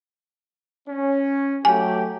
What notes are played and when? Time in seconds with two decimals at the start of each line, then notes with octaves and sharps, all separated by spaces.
0.88 C#4
1.65 F#3 A3 G4 G#5